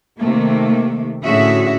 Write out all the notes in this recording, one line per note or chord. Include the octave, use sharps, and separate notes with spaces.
C3 D#3 A3 A#3
A2 D3 C#4 F#4 G#4 E5